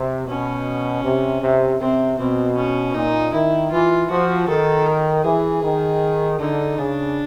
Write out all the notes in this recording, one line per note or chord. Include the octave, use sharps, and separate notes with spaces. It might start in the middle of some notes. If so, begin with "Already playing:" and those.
Already playing: C3
B2 C#4
C3
C3
C3 C4
B2 C4
C#4
A#2 D#4
D#3 E4
E3 F4
F3 F#4
D#3 A4
A#4
E3 G#4
D#3
D3 D#4
C#3 D4